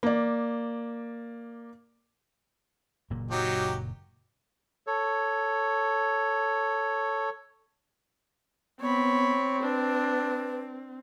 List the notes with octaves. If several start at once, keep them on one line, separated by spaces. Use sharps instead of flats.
A#3 D5
F#1 A#2 A#3
F#3 D#4 G4
A4 C#5
B3 C4 C#5 B5
D4 B4